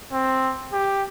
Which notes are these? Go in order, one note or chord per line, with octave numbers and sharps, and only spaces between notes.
C4
G4